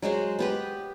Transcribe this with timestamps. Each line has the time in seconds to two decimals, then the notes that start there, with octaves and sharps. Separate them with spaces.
0.02 F#3 G#3 F#4 C5
0.39 B3 G4 B4